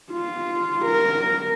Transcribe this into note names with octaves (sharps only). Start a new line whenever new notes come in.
F4
A#4